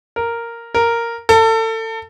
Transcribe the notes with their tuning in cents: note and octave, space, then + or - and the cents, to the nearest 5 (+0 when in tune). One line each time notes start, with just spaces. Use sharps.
A#4 -5
A#4 -5
A4 +30